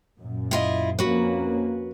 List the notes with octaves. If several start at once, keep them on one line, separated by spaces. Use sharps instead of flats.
F#2 A#2
E4 F4 D#5
F2 A#3 C#4 F#4 B4